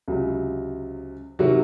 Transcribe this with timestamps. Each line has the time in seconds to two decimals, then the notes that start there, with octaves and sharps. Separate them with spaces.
0.08 C#2 C3 F#3
1.39 C3 D#3 F#3 F#4